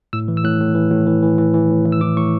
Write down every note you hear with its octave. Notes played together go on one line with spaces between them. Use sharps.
A2 E6
E3
E6
A2 F#6
A2
E3
A2
E3
E3
E3
E3
A2
E3
E6
A2 D6
A2 C#6